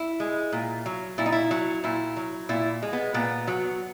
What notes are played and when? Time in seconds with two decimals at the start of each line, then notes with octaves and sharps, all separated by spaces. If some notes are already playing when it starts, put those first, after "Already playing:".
Already playing: E4
0.20 G#3
0.53 A#2
0.86 F#3
1.18 A#2 E4
1.26 D#4
1.32 E4
1.51 F#3
1.84 A#2 E4
2.17 F#3
2.49 A#2 E4
2.82 G#3
2.93 B3
3.14 A#2 B3
3.47 F#3